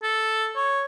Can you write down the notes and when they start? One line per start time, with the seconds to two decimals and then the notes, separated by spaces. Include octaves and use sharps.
0.03 A4
0.56 C#5